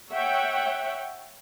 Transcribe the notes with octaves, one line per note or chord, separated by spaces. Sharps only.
C#5 E5 F#5 G5